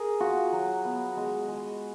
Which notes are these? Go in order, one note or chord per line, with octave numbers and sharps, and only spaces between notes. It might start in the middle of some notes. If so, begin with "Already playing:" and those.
Already playing: G#4 A#4
F4 F#4
F#3
B3
G#3
G#3